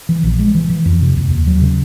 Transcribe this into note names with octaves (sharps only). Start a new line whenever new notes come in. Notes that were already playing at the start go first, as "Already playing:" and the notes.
E3
A#1
G#3
E3
E3
F2
C3
D#2
D#2
F#3
C#3